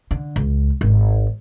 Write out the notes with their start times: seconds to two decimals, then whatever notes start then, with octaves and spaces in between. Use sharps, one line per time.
0.11 D3
0.36 C#2
0.81 G#1